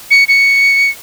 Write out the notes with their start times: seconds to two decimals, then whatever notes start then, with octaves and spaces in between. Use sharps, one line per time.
0.11 C#7
0.28 C#7